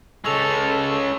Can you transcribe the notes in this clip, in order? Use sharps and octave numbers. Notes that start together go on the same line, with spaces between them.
C#3 G#3 A4 C#6 E6 F7